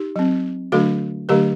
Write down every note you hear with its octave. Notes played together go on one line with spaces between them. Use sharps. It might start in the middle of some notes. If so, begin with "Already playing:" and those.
Already playing: D#4 G4
F#3 C4
D3 F#3 A3 D4 F#4 A4
D3 F#3 A3 D4 G4 A#4